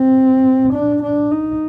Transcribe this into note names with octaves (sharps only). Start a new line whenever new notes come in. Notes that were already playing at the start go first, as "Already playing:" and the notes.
Already playing: C4
D4
D4
D#4